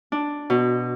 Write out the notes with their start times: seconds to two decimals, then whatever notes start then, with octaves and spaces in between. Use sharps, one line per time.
0.12 D4
0.50 B2